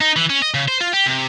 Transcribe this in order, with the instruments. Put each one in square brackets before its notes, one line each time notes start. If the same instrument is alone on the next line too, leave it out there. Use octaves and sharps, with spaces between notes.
[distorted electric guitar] D#4
E3
C#4
D#5
C#3
C5
F4
G4
C3